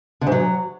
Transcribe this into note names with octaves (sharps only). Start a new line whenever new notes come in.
D3
G#2
F#3